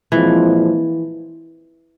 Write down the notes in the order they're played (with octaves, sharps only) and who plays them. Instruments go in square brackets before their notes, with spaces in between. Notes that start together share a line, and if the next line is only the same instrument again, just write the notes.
[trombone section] A#2 F3 G#3 C4 [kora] E3